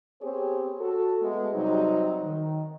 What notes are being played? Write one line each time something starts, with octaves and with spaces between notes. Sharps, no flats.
B3 C4 G4 G#4 C5 C#5
F#4 A4
G#3 A3 B3
C3 F#3 G3 C4 D#4
D#3